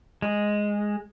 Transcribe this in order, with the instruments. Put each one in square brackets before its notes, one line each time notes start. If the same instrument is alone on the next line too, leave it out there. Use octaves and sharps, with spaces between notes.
[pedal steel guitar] G#3